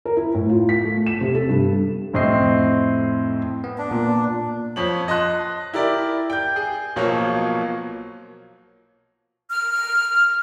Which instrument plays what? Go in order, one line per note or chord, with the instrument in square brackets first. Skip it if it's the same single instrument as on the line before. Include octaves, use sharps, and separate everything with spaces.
[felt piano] A#4
E4
A2
F4
B6
A3
E7
C3
A4
G2
[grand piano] F2 A2 C4 D#5 C7
[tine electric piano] B3
[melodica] D4
[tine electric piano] A#2
[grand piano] F2 C#5 F#7
D#5 A5 C6 F#6
E4 G4 A#4 D5
G5 G6
G#4
B1 B2 F3 F#3 A#3 C#5
[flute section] F6